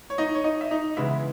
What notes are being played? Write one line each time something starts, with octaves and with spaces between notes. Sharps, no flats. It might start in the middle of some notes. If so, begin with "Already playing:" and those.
C#5
D#4 D#5
C#5
D#4 D#5
E5
D#4 D#5
C#3 E3 G#3 B3 E4 E5